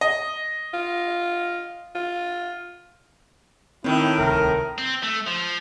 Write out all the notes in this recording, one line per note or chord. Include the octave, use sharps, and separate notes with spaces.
D#5
F4
F4
A2 D#3 C4 E4
D1 C2 C3 A#4
C4
A3
F3